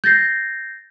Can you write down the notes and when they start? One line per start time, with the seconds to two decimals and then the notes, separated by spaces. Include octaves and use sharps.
0.04 G6 A6 A#6 C7